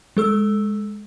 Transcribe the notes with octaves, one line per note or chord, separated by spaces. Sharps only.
G#3 A4 E6